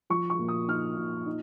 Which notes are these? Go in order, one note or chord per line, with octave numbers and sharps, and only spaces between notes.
F3 C#6
C#6
A#2
D#6
D#4 F6
A#2
D#4